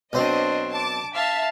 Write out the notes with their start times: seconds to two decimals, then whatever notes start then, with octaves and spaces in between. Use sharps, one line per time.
0.13 B1 C4 D4 C5 D#5
0.71 A5 D6
1.14 E5 F5 A5